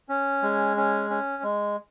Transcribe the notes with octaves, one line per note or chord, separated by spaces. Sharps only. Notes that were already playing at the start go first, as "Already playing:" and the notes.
C#4
G#3
C#4
C#4
G#3